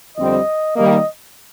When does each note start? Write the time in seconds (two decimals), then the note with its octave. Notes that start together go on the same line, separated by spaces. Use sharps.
0.17 F2 D3 G3 C4 D#5
0.76 D#3 G3 A#3 D#5